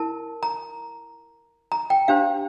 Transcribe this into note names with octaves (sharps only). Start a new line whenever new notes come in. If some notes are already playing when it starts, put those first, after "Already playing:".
Already playing: E4 A#4 A5
A#5
A#5
G5
D4 G4 C5 F5